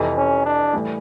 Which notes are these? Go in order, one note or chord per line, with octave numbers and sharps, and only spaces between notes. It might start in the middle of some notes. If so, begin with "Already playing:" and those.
Already playing: F1 F2 C3 E3
C#4
D4
A2 E3 G3